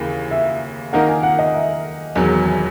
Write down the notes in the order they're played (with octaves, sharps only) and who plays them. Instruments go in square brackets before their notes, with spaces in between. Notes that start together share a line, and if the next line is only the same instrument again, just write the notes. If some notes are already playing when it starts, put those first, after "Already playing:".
Already playing: [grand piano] D#2 C#3 E3 [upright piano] A#4
[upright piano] E5
[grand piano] D#3 A#3 D#4 A#4 [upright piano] F#5
[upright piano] G#5
F#5
D#5
E5
[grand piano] E1 E2 D#3 F#3
[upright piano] G#5